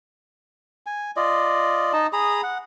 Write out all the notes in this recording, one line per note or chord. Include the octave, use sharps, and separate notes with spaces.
G#5
F4 D5 D#5
D#4 D#5 A5
G#4 A#5 B5 D#6
F#5